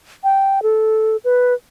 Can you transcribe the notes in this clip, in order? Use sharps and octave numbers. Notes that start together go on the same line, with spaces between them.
G5
A4
B4